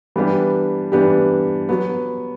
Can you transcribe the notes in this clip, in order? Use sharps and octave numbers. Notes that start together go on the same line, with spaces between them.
E3 G3 B3 D4 G4
E3 G3 B3 D4 G4
F#3 B3